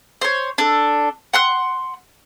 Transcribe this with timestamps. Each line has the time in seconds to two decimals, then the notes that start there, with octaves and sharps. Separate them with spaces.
0.21 C5 C#5
0.58 D4 A4
1.33 F#5 C6 F#6